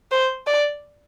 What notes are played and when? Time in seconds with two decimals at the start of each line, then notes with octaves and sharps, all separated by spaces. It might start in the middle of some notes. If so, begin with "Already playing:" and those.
0.11 C5
0.47 D5